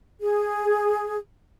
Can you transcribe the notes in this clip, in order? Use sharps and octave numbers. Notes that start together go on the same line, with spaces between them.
G#4